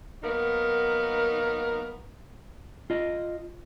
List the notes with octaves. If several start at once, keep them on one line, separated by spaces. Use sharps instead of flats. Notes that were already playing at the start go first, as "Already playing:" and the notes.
F#3 A#3 B3 D#4 A#4
F4 D#5